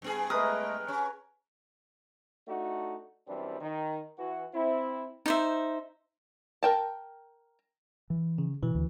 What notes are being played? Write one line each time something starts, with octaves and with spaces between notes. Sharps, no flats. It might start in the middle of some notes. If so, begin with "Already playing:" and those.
G2 B3 G#4
G#3 A3 A#4 B4 A#5 D#6
C#4 C#5
A3 D4 D#4 F#4
F#2 E3 G3 C4 D4
D#3
E3 F#4
C4 E4
D#4 C5 E5
A#4 G5 A5
E3
C#3
B2 E3
D2